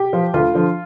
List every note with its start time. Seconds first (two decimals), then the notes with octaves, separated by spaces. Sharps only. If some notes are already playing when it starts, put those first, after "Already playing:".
Already playing: G4
0.13 F3
0.34 D2 F4
0.54 D3 F3